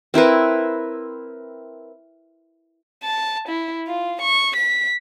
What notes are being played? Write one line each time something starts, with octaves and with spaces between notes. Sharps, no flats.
C4 E4 A#4 B4
A5
E4
F4
C#6
B6